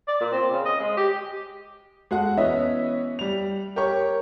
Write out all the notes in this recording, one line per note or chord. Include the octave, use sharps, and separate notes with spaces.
D5
A#2
C4
C#3
D#5
G#3
G4
G#3 F#4 A4 F#5
E3 B3 C#4 C#5 D#5 E5
G3 F7
G4 A#4 C#5 C#6